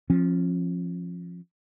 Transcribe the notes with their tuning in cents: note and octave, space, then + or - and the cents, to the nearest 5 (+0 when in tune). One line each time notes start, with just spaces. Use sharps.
F3 +0 C#4 -45